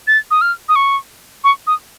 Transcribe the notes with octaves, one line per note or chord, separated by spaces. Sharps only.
A6
D#6
F6
D#6
C#6
C#6
D#6